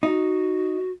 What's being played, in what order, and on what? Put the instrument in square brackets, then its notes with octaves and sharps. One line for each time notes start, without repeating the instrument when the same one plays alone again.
[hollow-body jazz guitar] D#4 [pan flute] F#4